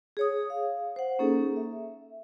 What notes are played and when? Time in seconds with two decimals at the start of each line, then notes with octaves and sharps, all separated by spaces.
0.17 G#4 C#5 D#6
0.50 F5
0.96 C5 F#5
1.19 A#3 C#4 D#4 G#4 A4
1.56 E5